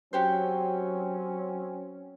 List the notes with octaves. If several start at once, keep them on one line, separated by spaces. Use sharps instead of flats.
F#3 C4 C#4 F#4 G4 C5